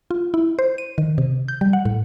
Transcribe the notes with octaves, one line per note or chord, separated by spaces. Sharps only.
F4
E4
C5
D#7
D#3
C3
G6
G3
F#5
A2